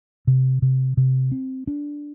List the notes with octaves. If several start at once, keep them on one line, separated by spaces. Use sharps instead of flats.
C3
C3
C3
C4
D4